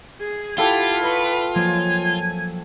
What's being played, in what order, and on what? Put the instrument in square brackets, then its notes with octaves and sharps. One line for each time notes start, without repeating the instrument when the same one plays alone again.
[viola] G#4
[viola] E4 G4 [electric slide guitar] F4 [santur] A4 G5 [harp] F#5 B5 D6
[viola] B4 [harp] D#5 B5 C#6
[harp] F3 F#3 A#3 [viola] G#5